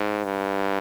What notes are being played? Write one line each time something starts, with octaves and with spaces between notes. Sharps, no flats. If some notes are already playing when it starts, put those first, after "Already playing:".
Already playing: G#2
G2